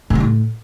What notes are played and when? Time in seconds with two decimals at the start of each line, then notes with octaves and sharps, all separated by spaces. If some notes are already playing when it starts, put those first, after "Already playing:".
0.10 G#2
0.15 G3
0.20 A2